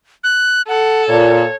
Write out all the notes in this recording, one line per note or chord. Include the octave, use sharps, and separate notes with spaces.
F#6
A4 F#5
A#2 C#5